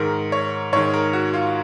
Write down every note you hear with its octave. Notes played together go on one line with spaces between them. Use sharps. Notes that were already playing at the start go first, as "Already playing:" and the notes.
Already playing: G#2 D#3 A#4
C#5
G#2 D#3 C#5
A#4
F#4
F4